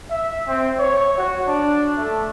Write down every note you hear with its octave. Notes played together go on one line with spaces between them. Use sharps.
E5
C4
C#5
F#4
D4
A3